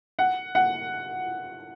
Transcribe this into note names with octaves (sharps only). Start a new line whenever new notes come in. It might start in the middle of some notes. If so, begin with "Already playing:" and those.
F#5
F#5